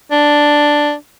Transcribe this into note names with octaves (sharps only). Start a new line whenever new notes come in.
D4